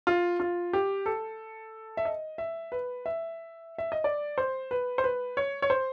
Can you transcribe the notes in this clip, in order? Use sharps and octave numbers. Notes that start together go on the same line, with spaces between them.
F4
F4
G4
A4
E5
D#5
E5
B4
E5
E5
D#5
D5
C5
B4
C5
B4
C#5
C#5
C5